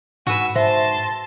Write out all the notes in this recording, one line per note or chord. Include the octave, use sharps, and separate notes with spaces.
G#2 F#4 B4 G#5 E6
G#2 C5 E5 A5 C6 A#6